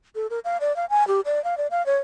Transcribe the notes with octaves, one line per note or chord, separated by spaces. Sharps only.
A4
A#4
F5
D5
F5
G#5
G4
D5
F5
D5
F5
C#5